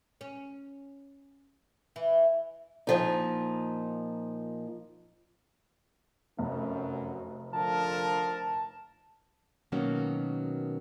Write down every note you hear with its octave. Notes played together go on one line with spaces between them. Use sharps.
C#4
E3
A#2 F3 D#4
F1 F#2
D3 F3 A#4 A5
B2 D#3 F#3 A#3 C#4 F#4